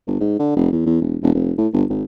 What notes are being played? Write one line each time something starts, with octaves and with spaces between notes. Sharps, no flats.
G1
G#2
D3
F1
E2
E2
E1
E1
F1
A2
G1
G#1